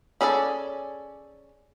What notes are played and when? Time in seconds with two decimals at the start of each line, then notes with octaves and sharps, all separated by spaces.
0.21 C#4 G#4 A4 B4 D5